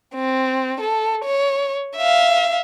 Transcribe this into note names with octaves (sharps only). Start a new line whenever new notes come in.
C4
A4
C#5
E5 F5